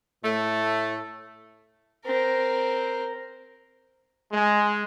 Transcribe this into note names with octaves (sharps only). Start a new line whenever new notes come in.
A2 A3
C4 A#4
G#3